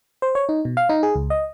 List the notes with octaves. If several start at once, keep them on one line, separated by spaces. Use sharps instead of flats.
C5
C#5
D#4
B2
F5
D#4
G#4
C#2
D#5